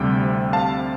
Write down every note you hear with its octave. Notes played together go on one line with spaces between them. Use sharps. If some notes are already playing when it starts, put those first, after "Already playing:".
Already playing: D2 C3 G3 G5
F5 A5